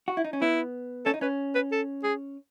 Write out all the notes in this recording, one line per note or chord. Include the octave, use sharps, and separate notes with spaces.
F#4
E4
D#4
C#4
B3 E4
C#4 A4
D#4
C#4 B4
B4
A4
G#4